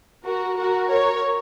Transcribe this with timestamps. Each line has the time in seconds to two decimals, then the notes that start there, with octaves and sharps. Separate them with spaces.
0.24 F#4 A#4
0.57 F#4 A#4
0.89 A#4 C#5